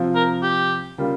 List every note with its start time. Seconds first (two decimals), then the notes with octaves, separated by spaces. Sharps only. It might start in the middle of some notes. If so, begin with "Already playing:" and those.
Already playing: C3 F3 C4 F4
0.15 A#4
0.43 G4
0.98 C#3 G3 A#3 F4